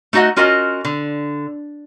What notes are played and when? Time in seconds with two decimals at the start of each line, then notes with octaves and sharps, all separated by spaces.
0.13 A3 D#4 F#4 D#5 F#5
0.36 C#4 F4 F#4 A#4 D#5
0.85 D3